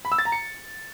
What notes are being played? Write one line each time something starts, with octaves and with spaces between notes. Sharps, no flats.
B5
E6
A6
A#5
C#7